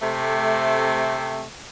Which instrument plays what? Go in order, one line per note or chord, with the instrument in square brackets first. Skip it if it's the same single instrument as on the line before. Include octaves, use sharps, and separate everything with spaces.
[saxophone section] C3 A3